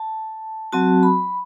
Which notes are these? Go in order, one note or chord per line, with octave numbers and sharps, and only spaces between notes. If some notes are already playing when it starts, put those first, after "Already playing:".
Already playing: A5
F#3 C4 F#4 A5
B5